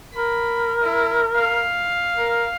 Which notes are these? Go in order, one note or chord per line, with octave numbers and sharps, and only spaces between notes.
A#4 B5
E4
F5
A#4